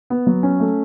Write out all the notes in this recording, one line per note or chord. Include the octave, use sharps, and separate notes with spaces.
B3
F#3
C#4
A3